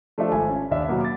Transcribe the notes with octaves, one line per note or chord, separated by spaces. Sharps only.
F3 A3 D4 G4 C5 E5
G#1 G#5
C#4
D#2 D4 E5
B2 F#3 A#3 B3
D6 A6